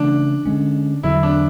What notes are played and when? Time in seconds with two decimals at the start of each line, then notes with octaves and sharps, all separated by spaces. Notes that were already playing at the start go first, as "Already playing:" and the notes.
Already playing: C#3 E3 A3 C#4 D4
0.46 D3 G#3 C#4
1.03 E2 D3 F#3 E4
1.23 D4